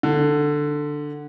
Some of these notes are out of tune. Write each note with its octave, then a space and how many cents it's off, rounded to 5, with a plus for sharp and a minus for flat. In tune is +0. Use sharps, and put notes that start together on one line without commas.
D3 +10